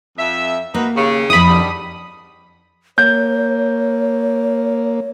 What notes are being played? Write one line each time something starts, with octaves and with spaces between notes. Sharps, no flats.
F2 E5
A#3 D#4 F#4 B4
D#2 C#3
F2 E4 B5 D#6
D3 D#3 G3
A#3 C#5 G6